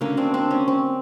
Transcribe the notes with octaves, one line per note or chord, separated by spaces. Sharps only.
D3 F#3 A#3 C#4
C4 D4
C4 D4
C#4
C4